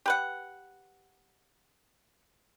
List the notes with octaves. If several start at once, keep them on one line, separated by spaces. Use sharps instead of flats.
G4 B4 F#5